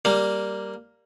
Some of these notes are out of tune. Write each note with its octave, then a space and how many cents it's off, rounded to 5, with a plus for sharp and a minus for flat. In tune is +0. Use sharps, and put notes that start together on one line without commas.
G3 +0 A#3 +0